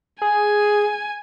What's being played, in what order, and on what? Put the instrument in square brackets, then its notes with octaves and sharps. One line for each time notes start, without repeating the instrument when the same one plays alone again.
[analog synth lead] G#4 [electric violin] G#5